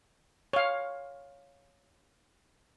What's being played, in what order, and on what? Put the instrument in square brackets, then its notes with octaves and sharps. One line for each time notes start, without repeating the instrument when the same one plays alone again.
[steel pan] C#5 F5